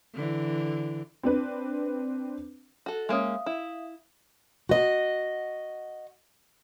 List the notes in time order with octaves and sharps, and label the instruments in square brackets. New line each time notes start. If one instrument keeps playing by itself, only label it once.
[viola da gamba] D3 E3
[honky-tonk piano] C4 D4 B4
[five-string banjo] F#4 A4
[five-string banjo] G#3 A#3 C#4 [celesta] E5 F5 D#6
[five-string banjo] E4
[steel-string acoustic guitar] F#4 D#5